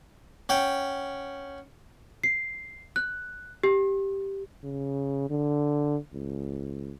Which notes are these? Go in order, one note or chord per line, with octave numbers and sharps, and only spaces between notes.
C#4 F#5 G5
C7
F#6
G4
C#3
D3
C#2